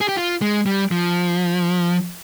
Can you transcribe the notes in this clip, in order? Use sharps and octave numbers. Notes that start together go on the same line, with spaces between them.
G#4
G4
F4
G#3
G3
F3